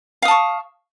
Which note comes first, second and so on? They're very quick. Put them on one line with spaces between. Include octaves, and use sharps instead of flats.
F5 D#6 A5 C#6